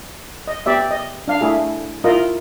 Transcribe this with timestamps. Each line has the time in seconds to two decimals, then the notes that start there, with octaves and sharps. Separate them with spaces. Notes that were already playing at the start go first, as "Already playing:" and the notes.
0.48 D#5
0.66 B3 G4 D5 E5
0.91 D#5
1.28 D4 F5
1.41 A3 E4 G#4
2.04 E4 F4 A#4 D#5